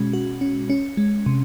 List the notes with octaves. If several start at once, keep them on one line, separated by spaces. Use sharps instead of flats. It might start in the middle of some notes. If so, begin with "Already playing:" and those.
Already playing: B2 G#3 C#4 F#4
F#4
C#4
C#4
G#3
C3